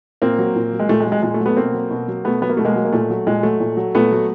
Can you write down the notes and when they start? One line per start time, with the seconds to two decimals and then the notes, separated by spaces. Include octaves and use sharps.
0.22 A#2 A#3 C4
0.38 F#3
0.55 A#2
0.72 F#3
0.80 G#3
0.89 A#2 A3
1.00 G#3
1.06 F#3
1.12 G#3
1.23 A#2 G#3
1.34 A3
1.40 F#3
1.46 A3 B3
1.57 B2 A#3 C4
1.73 F#3
1.91 B2
2.08 F#3
2.24 B2 A3 B3
2.42 F#3 B3
2.49 A#3
2.57 B2 A3
2.65 G#3 A#3
2.76 F#3
2.85 A#3
2.92 A#2 A3
3.10 F#3
3.27 A#2 G#3
3.43 F#3 A3
3.60 A#2
3.77 F#3
3.95 A#2 A3 B3
4.12 F#3